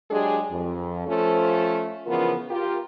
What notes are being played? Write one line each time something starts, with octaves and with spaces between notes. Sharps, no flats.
F#3 G#3 D4 G4 G#4
F2
F3 A3 C#4 F4 A4 C5
C#3 E3 F3 B3 F4 A#4
F4 G4 A#4